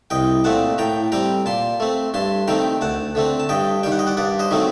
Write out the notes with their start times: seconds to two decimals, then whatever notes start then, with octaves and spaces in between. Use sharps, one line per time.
0.10 C2 D#5 G5
0.44 A#2 A3 C4 F#5 A5
0.78 A2 G5 A#5
1.12 G3 C4 G5 A#5
1.46 A#2 A5 C6
1.80 A3 C4
2.14 G2 A5 C6
2.48 D#3 A3 C4 G5 A#5
2.81 D2 F#5 A5
3.15 D3 A3 C4
3.40 A5
3.49 G2 D#5 G5
3.83 D#3 G3 G5
3.92 F#5
3.99 D#5
4.07 D5 F#5
4.17 G2 D5 F#5
4.39 C5 D#5
4.51 D#3 F#3 A3 C4